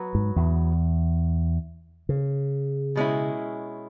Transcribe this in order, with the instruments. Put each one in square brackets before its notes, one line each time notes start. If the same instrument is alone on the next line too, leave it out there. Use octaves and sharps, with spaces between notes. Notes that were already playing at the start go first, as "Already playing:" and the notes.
Already playing: [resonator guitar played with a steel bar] F#3 B3 F#4 B4
[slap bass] G#2
E2
C#3
[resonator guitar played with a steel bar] B2 G#3 C#4 E4